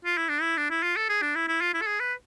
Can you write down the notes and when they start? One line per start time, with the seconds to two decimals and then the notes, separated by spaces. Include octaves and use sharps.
0.05 F4
0.17 E4
0.29 D4
0.41 E4
0.57 D4
0.70 E4
0.83 F4
0.97 A4
1.09 G#4
1.22 D4
1.35 E4
1.48 E4
1.61 F4
1.74 E4
1.82 A4
1.87 G#4
2.00 B4